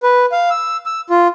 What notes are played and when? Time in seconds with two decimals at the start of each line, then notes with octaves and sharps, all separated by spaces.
0.03 B4
0.32 F5
0.50 E6
0.86 E6
1.10 F4